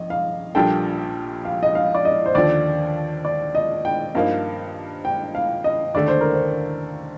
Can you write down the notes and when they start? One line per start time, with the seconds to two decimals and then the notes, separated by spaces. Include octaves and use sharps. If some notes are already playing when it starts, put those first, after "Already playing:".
Already playing: A#1 D#5
0.10 F5
0.55 A#1 A#2 G3 D4 A4 G5
1.45 F5
1.63 D#5
1.75 F5
1.95 D5
2.05 D#5
2.26 C5
2.35 D#2 D3 F3 D5
3.25 D5
3.55 D#5
3.85 G5
4.15 G2 F3 A#3 D#4 F5
5.05 G5
5.35 F5
5.64 D#5
5.95 D#2 D3 A3 D5
6.08 C5
6.21 A#4
6.33 C5